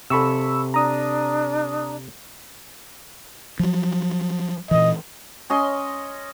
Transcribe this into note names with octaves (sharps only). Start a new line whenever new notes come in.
C3 A4 B5 C#6 E6
D4 A#5 D#6
F3 F#3
A#2 E3 D#5
C#4 D#5 C6